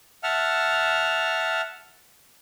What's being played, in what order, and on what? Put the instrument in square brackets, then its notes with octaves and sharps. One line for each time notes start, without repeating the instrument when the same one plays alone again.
[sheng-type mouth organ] E5 F#5 A5 F6